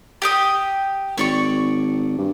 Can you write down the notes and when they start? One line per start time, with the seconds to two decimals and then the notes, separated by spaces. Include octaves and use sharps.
0.22 G4 G5 D#6
1.18 G#1 C#5 D5 C#6
2.18 G2